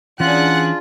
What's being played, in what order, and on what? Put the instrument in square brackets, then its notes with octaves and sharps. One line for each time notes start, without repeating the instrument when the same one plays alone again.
[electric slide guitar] E3 C#4 [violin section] D4 G#4 F#6 [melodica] F4 [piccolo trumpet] F#5